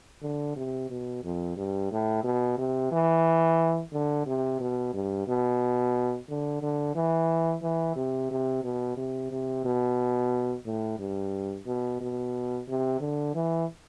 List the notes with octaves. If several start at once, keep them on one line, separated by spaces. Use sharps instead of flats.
D3
C3
B2
F2
G2
A2
B2
C3
E3
D3
C3
B2
G2
B2
D3
D3
E3
E3
C3
C3
B2
C3
C3
B2
A2
G2
B2
B2
C3
D3
E3